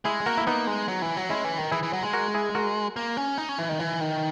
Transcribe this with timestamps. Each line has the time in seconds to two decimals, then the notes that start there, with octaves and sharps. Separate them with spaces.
0.05 G#3 E4 G#4
0.26 A#3 F#4 A#4
0.38 E4
0.47 A#3 B3 D#4
0.67 G#3
0.88 F#3
1.02 E3
1.17 F#3
1.30 G#3 C#4 E4
1.44 E3
1.58 D#3
1.72 E3 E4 G#4
1.83 E3
1.93 F#3
2.03 G#3
2.13 F#4 A#4
2.34 E4 G#4
2.55 F#4 A#4
2.96 A#3
3.17 C#4
3.38 D#4
3.49 C#4
3.58 E3
3.69 D#3
3.79 E3
4.01 D#3